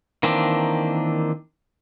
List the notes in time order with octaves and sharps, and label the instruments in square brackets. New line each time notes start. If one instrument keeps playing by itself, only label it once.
[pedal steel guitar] D#3 E3 A#3 C4 D4